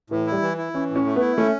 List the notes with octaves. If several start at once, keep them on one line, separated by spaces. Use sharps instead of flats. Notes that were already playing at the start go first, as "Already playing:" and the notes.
A2 E3
G3 E4
E3
E4
E3 C#4
A2
C#4
A3
B3 E4
A3 C#4